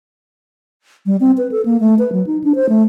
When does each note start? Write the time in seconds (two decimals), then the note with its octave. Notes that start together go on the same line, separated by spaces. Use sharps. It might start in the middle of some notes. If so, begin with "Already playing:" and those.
1.06 G3
1.20 C4
1.38 B4
1.52 A4
1.65 A#3
1.80 A3
1.99 B4
2.12 F#3
2.27 D#4
2.44 D4
2.55 C5
2.69 A3